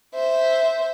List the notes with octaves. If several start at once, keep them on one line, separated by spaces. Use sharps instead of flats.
C5 E5